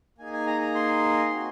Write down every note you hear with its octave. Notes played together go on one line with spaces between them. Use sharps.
A#3 D#4 G#4 G#5
G#5
A#5
A#5
C6
C4 F#4